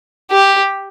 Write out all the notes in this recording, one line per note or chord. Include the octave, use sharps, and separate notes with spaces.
G4